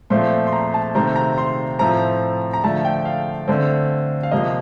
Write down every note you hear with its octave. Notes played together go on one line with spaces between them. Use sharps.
A#2 F3 A3 C4 C6
C6
A#5
A5
C3 D#3 A3 C4 A#5
A#5
C6
A2 F3 A3 C4 A#5
A#5
D3 F3 A3 A5
G5
F5
D3 A3 C4
F5
C3 F3 A#3 D#5